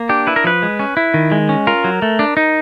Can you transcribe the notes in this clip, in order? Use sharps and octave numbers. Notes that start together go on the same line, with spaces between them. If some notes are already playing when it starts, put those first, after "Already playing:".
Already playing: A#3
D4 G4
E4 B4
A#4
F3 B4
G#3
C#4
E4
D#3
G#3
C#4
F4 A#4
F#3
A3
D4
D#4